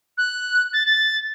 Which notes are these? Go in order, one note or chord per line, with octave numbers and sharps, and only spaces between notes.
F#6
A6
A6